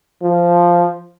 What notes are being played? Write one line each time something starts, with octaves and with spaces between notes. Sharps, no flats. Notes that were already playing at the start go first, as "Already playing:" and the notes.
F3